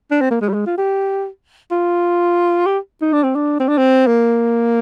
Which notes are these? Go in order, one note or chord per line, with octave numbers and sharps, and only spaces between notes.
D4
C4
A#3
G#3
G3
G#3
F4
G4
F4
G4
D#4
D4
C4
D4
C4
D4
C4
A#3